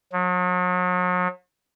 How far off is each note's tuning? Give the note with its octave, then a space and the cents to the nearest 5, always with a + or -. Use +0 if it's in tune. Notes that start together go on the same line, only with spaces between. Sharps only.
F#3 -40